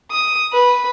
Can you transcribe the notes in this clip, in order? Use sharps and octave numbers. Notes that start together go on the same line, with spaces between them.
D#6
B4